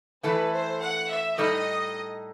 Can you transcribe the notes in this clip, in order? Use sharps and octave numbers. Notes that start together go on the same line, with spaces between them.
E3 A3 E4 A4 B4
C5
F#5
E5
A2 G3 D#4 A4 D#5